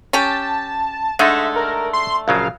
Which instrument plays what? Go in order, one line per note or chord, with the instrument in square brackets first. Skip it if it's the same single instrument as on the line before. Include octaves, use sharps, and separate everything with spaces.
[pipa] C#4 G4 [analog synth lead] A5
[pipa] D3 A3 [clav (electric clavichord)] G#3 D#4 A4 [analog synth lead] E5
[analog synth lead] A#4
C6
[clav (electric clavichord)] A#1 C#3 F#3 [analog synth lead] F5